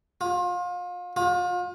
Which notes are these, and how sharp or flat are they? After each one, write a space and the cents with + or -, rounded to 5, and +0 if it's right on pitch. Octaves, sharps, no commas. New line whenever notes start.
F4 +35
F4 +40